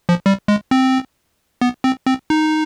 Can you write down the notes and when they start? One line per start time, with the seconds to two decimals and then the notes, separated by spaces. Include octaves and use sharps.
0.09 F3
0.26 G3
0.48 G#3
0.71 C4
1.61 B3
1.84 C4
2.07 C4
2.30 D#4